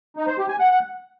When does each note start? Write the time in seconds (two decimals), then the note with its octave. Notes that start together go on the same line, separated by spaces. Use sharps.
0.16 D#4
0.27 C5
0.38 G4
0.48 G#5
0.59 F#5